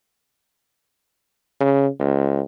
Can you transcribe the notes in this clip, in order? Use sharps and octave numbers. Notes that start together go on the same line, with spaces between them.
C#3
C#2